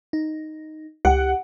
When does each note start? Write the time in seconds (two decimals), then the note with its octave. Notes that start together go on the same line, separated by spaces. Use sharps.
0.13 D#4
1.05 C#2 G4 F#5